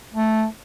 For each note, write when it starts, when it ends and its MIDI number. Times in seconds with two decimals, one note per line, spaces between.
0.14 0.45 57